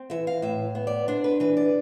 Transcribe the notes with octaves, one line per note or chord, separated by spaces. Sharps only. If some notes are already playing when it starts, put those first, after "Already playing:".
Already playing: C4
E3 E5
F5
A2 E5
B3
D5
D4 C5
B4
E3 B4
D5